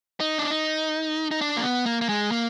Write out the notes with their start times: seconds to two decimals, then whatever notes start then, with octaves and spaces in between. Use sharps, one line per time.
0.20 D#4
0.38 D4
0.50 D#4
1.31 D#4
1.41 D4
1.57 A#3
1.63 B3
1.86 A#3
2.01 A#3
2.09 G#3
2.31 A#3